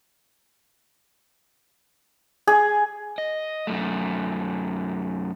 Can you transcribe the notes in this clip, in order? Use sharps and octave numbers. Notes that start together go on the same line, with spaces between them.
G#4
D#5
F#2 A3